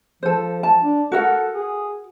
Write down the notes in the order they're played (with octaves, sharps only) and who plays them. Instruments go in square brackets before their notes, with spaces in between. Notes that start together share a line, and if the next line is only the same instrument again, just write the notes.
[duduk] F3 [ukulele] A4 C5
[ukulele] A5
[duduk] D4
[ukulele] F#4 A#4 F#5 [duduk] A4
[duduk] G#4